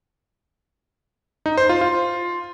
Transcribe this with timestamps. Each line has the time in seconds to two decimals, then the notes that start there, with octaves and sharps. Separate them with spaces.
1.46 D#4
1.58 C5
1.69 F4
1.81 F4